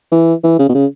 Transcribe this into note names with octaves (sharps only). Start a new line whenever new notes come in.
E3
E3
C#3
B2
C#3